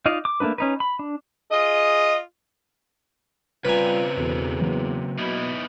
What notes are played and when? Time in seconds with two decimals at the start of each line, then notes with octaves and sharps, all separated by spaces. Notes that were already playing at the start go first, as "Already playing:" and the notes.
0.06 D#4 F4 D5 D#5 F5
0.25 D6
0.40 A3 A#3 D4 D#4 B4
0.58 C#4 D#4 B4
0.80 B5
0.99 D4
1.51 F4 G#4 D#5
3.65 C#3 G3 C4 F4 B4 G#5 A#5
4.17 E1 E2 F#4 A4
4.61 F#3 A#3
5.19 B2 B3 D#4 E4